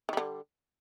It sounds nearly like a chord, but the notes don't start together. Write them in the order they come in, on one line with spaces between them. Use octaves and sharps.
D#3 G3 D3